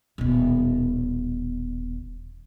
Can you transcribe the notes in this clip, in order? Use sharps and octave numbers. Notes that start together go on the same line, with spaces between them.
D#1 B2